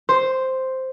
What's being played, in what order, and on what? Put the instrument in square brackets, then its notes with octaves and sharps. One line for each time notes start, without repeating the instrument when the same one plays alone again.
[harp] C5